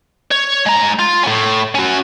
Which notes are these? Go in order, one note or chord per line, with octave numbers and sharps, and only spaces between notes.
C#5
G#3 A#5
F4
A2 C#4
C#4 F#4